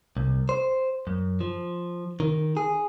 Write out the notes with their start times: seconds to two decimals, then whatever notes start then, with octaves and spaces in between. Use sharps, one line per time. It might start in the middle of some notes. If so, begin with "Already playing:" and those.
0.17 C2
0.49 C5
1.07 F#2
1.41 F3
2.20 D#3
2.57 G#4